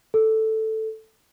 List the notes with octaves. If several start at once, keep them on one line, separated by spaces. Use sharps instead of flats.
A4